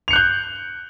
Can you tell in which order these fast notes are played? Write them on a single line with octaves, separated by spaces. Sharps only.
F7 C#7 F#6 G6